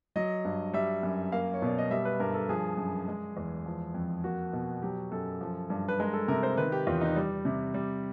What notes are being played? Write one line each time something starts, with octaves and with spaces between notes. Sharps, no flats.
F#3 D#5
G2
G3 E5
F#2
A#3 F5
C#5
B2 D5
D#5
G3 E5
B4
G2 A#4
A4
F3 G#4
F#2
G#3
E2
F3
F2
A#3 F#4
B2
F#3 G4
F#2 A4
F3
G2
B4
G#3 A#4
A4
C3 A#4
C5
D#3 B4
G4
E2 F4
D#4
G3
C3
G3